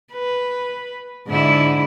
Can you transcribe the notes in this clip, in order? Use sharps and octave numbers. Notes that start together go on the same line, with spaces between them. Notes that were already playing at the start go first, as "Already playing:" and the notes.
B4
G#2 D3 E4